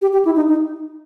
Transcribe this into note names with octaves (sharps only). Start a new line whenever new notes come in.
G4
G4
E4
D#4
D#4